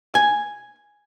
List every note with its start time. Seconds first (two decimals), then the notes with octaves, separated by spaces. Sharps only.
0.15 G#5